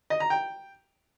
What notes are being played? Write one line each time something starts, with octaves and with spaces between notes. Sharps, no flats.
D#5
A#5
G5